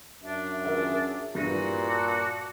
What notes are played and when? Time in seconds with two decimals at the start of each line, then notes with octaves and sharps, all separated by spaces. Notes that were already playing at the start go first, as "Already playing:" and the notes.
0.23 F#2 D4 E5
0.64 C#4 F4 G#4 A#4 E5 F#5
1.35 G2 A#2 E4 F#4 G4 B4 A#6 D#7
1.87 A5 D6 F#6